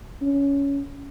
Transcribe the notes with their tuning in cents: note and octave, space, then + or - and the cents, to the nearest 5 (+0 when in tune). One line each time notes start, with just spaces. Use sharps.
C#4 +15